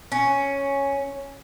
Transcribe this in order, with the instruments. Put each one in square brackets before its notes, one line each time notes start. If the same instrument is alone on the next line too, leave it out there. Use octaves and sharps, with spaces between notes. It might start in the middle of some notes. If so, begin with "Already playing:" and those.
[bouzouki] C#4